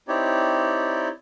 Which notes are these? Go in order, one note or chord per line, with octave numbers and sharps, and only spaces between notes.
C4 D#4 E4 G4 C#5 D5